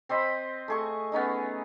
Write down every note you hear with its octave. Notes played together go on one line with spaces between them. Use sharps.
C4 C5 D#5 B5
A3 G#4 C#6
B3 C#4 D#4 D#5